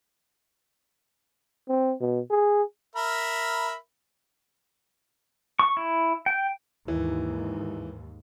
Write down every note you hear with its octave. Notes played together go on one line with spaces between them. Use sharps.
C4
B2
G#4
A#4 E5 B5
C#6
E4
G5
D#2 G#2 E3